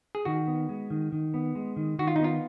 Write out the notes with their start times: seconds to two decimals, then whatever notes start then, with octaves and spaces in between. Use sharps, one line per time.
0.15 G#4
0.25 D#3 F#4
0.47 B3
0.69 G#3
0.90 D#3
1.12 D#3
1.34 B3
1.55 G#3
1.76 D#3
1.99 D#3 F#4
2.08 F4
2.16 D#4
2.21 B3 F4